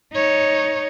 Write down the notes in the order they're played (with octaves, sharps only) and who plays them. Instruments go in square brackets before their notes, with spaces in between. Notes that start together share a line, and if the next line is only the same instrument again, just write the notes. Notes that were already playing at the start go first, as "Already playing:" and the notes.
[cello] D#4 C#5